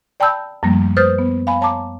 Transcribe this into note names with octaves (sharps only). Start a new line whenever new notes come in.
D5 G5 A5 B5 E6 G6
F#2 F3 G3 A3 A#3
B4 C5 D#6 F6 G6 A6
B3
F5 G#5 B5
C#5 A5 A#5 D6